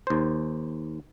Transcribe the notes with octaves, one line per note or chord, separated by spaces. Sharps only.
D#2 C5